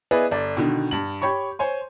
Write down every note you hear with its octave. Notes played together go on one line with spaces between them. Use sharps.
B3 E4 G#4 B4 D5 D#5
G1 D5
B2 D3 D#3
G2 F#7
G4 C#5 B5 C#6
C5 C#5 G#5 C6